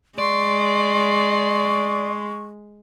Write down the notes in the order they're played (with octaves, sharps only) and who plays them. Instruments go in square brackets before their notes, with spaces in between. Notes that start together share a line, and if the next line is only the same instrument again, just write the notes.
[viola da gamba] G#3 [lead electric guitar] D5 [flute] C6 [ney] C#6